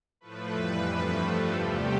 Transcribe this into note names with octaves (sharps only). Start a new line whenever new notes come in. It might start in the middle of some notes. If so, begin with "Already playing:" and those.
A2 F3 A3 B4
F2 E3 G3
G2 F3 A3 B4
G2 F3 A3 A4
E2 C3 G3 G4